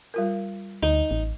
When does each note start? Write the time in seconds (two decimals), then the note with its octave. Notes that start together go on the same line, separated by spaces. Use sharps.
0.14 G3 F4 A#4
0.83 D2 D#4
1.11 A1